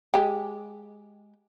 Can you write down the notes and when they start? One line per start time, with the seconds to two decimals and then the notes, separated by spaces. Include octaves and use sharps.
0.14 G#3 G4